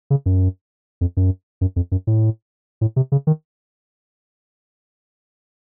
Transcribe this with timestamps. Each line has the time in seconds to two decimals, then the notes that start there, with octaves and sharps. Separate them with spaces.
0.10 C#3
0.26 F#2
1.01 F2
1.17 F#2
1.61 F#2
1.76 F2
1.92 F#2
2.07 A2
2.81 A2
2.96 C3
3.12 C#3
3.27 D#3